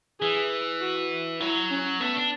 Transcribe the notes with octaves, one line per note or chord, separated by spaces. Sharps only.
E3 G#4
F#4
F#3 E4
C#4
A3 B3
D4